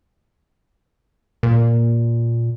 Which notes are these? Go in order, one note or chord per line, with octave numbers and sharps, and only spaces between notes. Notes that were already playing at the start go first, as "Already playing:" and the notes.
A#2